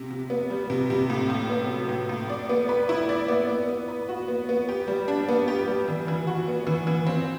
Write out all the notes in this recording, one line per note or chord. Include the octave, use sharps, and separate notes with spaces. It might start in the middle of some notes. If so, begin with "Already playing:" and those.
Already playing: C3
C3
B3
G3
C3
C3
A2
A2
B3
F#3
A2
A2
D5
B3
B4
E4
D5
B3
B3
B3
B4
F#4
B3
B3
G4
G3
D4
B3
G4
G3
E3
E3
F#4
B3
E3
E3
C4